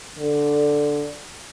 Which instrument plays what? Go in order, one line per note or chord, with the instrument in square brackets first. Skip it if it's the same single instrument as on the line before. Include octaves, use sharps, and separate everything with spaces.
[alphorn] D3